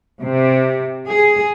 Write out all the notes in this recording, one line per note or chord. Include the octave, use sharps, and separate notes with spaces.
C3
G#4